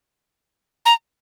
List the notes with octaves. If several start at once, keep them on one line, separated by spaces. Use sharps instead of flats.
A#5